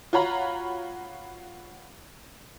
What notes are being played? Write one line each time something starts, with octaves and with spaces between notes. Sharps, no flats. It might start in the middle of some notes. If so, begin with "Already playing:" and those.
F4 F#4 C#5 A#5 B5